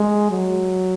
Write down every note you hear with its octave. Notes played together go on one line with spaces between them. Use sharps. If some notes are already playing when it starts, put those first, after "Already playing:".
Already playing: G#3
F#3